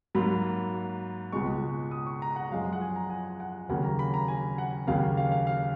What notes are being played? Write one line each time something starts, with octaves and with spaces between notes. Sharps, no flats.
G#2 F#3 A#3 B5
C#2 B2 G#3 C#6
D#6
C#6
A#5
F#5
F#2 F3 G#3 F5
F#5
G#5
A#5
G#5
F#5
D#2 C#3 F#3 A#3 F#5
A#5
B5
A#5
G#5
F#5
D#2 C#3 F#3 A#3 F5
F5
F5
F5